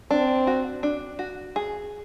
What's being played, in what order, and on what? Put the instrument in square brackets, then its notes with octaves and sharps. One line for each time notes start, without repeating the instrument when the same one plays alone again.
[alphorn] C4 [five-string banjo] D4
[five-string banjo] F#4
D4
F#4
G#4